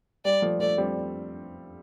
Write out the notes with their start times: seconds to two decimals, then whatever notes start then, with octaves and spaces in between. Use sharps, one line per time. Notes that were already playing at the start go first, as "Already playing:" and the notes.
0.25 G3 D5
0.42 F3 A3
0.60 F3 A3 D5
0.78 G3 C4